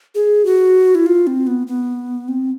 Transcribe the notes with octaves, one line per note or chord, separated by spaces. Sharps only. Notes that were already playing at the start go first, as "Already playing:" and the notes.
G#4
F#4
E4
F4
C4
B3
B3
C4